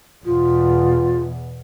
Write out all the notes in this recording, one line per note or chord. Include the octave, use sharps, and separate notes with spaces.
E2 B2 F4